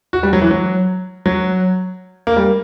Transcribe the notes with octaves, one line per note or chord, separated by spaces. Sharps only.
F#4
G3
F#3
E3
F#3
F#3
A#3
G3